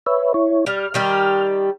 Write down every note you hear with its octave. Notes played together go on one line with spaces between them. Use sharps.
B4 C#5 E5
E4 C#5
G3 F6
D#3 G3 G4